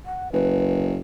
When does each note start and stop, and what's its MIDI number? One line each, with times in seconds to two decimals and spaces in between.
0.06 0.32 78
0.33 0.99 30
0.33 0.89 71